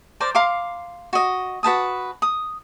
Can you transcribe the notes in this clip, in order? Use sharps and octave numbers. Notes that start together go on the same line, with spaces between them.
A#4 C5 D5 D6
F5 A#5 C6 D6
F#4 D#5
F#4 B4 A5 D#6
D#6